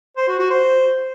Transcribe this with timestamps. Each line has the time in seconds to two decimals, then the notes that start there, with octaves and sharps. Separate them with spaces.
0.17 C5
0.28 F#4
0.39 F#4
0.50 C5